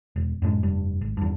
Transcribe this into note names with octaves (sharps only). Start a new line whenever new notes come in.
E1
F#2 A2 F#3 G#3
F1 G2
G#1
E2 G2